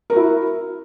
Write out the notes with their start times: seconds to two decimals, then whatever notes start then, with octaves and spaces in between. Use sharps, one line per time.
0.10 A#4
0.13 F#4
0.16 E4